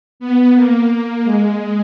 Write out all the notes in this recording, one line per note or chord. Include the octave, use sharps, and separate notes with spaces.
B3
A#3
A#3
G#3